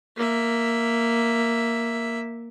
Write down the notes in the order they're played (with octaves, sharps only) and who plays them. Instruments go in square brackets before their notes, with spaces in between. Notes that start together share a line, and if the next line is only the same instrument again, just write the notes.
[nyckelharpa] A#3 E5